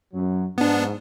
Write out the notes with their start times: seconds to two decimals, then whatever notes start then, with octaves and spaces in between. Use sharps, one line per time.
0.14 F#2 F#3
0.58 G#2 B3 D4